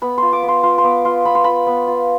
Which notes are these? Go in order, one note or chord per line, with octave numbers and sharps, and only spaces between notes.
B3 B5
F4 C6
D6
B3
C6
F4 C6
C6
B3 D6
F4 C6
B3 B5
C6
F4 B5
B3
F4